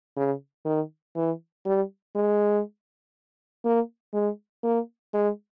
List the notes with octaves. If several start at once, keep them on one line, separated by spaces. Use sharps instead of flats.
C#3
D#3
E3
G3
G#3
A#3
G#3
A#3
G#3